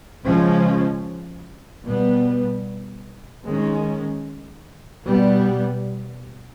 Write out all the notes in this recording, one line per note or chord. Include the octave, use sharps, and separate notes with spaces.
C#3 F3 G#3 C#4
B2 G3 B3
D#3 G#3 C#4
B2 G3 B3